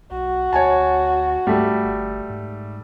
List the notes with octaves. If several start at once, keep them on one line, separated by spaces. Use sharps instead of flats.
B1 F#4
D2 C#5 G#5 A5
G#2 G3 A3
G1
G#2